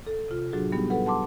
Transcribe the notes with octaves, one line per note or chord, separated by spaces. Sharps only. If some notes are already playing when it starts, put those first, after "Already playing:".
A4
C3 F4
A2 F#3 D4 F#4 G#4
G3 B3 D#4 G4
A4 B4 F#5
F#5 A5 C6 D6